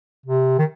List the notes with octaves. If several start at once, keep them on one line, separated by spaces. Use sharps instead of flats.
C3
D#3